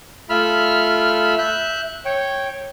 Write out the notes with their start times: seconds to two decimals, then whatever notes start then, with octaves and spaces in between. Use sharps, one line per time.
0.30 A3 F4 E5 B5 F6
1.39 E5 F#6 G6
2.06 C#5 G5